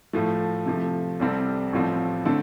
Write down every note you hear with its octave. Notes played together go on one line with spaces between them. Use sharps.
A2 F3 A3
C3 F3 A3
C2 C3 G3 C4 A4
A1 A2 F3 C4 A4
D3 A3 C4 A4